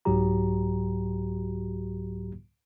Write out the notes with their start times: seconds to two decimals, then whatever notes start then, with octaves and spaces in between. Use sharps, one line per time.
0.05 C2 G#2 F#3 F#4 G4 A#5